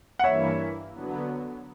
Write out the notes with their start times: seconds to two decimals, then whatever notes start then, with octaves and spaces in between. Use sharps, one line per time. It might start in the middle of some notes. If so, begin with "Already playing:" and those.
0.19 F#5
0.24 G2 E3 A#3 E4 C#5 E5
0.94 D3 F#3 B3